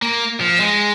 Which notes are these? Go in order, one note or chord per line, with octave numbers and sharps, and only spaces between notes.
A#3
F3
G#3